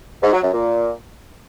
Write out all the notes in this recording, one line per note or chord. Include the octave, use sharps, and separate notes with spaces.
G#2
F#3
F#2
A#2